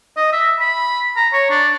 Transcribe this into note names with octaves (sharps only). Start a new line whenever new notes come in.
D#5
E5
B5
A#5
C#5
D4